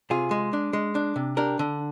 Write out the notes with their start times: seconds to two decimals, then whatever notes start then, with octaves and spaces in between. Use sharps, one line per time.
0.10 C3 F4 G#4
0.31 G#3
0.53 D4
0.73 G#3
0.95 D4
1.16 C3
1.37 D4 G4 A#4
1.59 D3